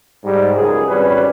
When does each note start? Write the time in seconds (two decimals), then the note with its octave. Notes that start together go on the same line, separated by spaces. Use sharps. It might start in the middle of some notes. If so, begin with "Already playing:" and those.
0.24 G#2 G3
0.55 C#2 F#2 G#4
0.89 G#1 G3 C#4 B4